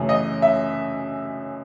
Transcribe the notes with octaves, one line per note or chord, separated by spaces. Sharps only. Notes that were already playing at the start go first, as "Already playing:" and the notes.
Already playing: F#2 C#3 E3 A3
D#5
E5